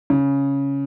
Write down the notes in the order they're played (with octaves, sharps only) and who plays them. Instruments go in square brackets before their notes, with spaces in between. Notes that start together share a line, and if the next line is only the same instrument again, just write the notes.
[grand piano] C#3